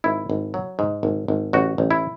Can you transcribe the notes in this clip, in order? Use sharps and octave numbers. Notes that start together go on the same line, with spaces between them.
G#1 E4
G#1
F#3
G#2
G#1
G#1
A1 F#4
A1
E4